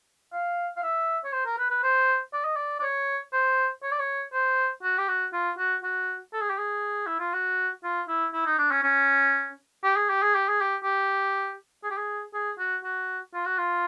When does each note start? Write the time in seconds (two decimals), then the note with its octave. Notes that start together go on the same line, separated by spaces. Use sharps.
0.33 F5
0.77 F5
0.83 E5
1.24 C#5
1.32 C5
1.45 A#4
1.58 B4
1.70 B4
1.83 C5
2.33 D5
2.44 D#5
2.56 D5
2.79 D5
2.83 C#5
3.33 C5
3.83 C#5
3.91 D5
3.99 C#5
4.33 C5
4.83 F#4
4.98 G4
5.08 F#4
5.33 F4
5.58 F#4
5.83 F#4
6.33 A4
6.41 G#4
6.50 G4
6.58 G#4
7.06 E4
7.20 F4
7.33 F#4
7.84 F4
8.08 E4
8.33 E4
8.46 D#4
8.58 D4
8.70 C#4
8.83 C#4
9.83 G4
9.96 G#4
10.09 G4
10.22 G#4
10.35 G4
10.48 G#4
10.61 G4
10.84 G4
11.84 G#4
11.91 G4
11.97 G#4
12.33 G#4
12.59 F#4
12.84 F#4
13.34 F4
13.45 F#4
13.58 F4